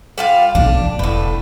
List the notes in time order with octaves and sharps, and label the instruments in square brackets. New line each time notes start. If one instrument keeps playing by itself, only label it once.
[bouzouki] G3 F4 F5
[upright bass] B1 E3 [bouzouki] D4
[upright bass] F3
[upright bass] E1 [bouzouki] A2 B4